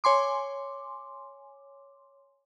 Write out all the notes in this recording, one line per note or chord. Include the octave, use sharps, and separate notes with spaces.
C#5 G#5 C6 D6